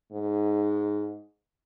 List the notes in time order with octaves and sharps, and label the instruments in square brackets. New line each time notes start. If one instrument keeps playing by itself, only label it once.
[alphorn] G#2